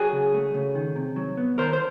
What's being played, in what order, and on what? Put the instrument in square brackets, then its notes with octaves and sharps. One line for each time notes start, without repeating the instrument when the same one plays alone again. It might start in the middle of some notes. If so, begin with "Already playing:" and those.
Already playing: [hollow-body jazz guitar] F#3 F#4 G#4
C#3
A3
C#3
D#3
C3
F#3
B3
D#3 A#4 C5
C5